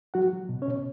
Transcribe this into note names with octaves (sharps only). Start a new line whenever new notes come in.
F#3 F#4 F#5
F#3
B2
C#4 C#5
B2